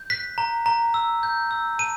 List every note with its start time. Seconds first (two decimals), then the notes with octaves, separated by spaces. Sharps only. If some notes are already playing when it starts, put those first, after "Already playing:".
Already playing: G6
0.10 F#6 B6
0.38 A#5
0.66 A#5
0.94 E6
1.23 G6
1.51 E6
1.78 A5 D#7